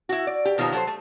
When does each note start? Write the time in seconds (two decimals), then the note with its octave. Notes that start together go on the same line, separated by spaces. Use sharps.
0.09 E4 F#4
0.27 D5
0.45 G4
0.58 B2 D#3 F3 F#3
0.72 F#3 A4 C5
0.87 A3